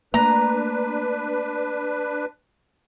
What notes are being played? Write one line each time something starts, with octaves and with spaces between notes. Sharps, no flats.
A3 A#3 D4 B4 A#5